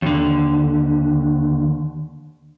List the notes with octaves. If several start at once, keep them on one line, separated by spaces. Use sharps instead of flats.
D#2 D3